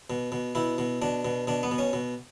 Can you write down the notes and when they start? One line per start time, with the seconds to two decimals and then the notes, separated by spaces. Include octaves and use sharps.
0.10 B2
0.32 B2
0.55 B2 E4
0.78 B2
1.02 B2 D4
1.25 B2
1.47 B2 D4
1.63 B3
1.71 B2
1.78 C#4
1.93 B2